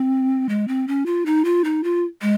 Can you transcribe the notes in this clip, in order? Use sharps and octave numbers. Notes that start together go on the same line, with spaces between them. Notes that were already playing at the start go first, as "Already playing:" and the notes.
Already playing: C4
G#3
C4
C#4
F4
D#4
F4
D#4
F4
G#3